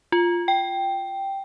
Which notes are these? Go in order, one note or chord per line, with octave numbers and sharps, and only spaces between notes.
F4
G5